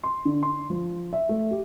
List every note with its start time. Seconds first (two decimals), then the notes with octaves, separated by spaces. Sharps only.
0.03 C6
0.25 D3
0.43 C6
0.70 F3
1.13 E5
1.29 A3
1.51 G4